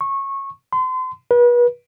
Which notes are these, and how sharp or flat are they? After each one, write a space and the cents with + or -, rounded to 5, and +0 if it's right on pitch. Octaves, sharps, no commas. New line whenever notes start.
C#6 -20
C6 -35
B4 -35